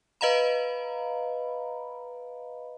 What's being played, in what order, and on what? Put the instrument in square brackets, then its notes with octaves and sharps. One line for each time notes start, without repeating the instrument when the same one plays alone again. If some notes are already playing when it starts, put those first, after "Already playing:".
[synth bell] B4 D#5 F5 A#5 B5